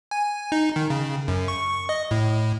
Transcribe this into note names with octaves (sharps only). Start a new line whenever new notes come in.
G#5
D#4
D#3
C#3
F#2
C#6
D#5
A2